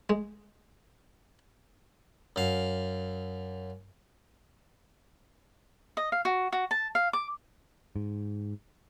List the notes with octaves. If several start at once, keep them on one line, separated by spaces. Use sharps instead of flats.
G#3
F#2 F5
D#5
F5
F#4
F#4
A5
F5
D6
G#2